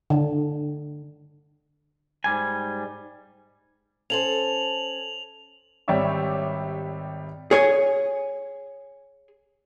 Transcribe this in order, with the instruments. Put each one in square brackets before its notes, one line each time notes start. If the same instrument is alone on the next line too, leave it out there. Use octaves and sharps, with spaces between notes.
[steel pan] D3
[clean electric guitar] G#2 G3 G#5
[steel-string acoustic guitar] C#4 A4 C5 [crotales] F7 F#7
[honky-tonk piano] G#1 G3 G4 C#5 E5 D6
[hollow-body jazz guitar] G#4 C#5 G#5